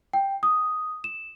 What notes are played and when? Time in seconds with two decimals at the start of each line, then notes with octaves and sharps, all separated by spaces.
0.13 G5
0.43 D#6
1.04 E7